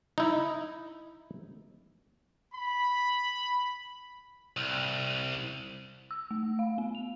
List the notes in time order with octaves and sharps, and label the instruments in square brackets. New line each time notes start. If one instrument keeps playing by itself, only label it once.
[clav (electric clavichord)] D#4 E4
[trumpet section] B5
[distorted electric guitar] C2
[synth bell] E6
A3
F5
B3
F7